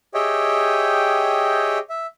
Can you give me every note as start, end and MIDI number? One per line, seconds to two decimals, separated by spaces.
0.14 1.78 67
0.14 1.78 68
0.14 1.78 73
0.14 1.78 75
0.14 1.78 76
0.14 1.78 79
1.90 2.06 76